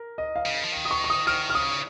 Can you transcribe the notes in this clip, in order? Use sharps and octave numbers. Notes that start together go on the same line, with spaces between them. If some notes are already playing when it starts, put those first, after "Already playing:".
Already playing: A#4
D#5
F5
C#3
F3
D#3
D#6
C#6
C#6
D#6
D#3 F6
F6
C#3 D#6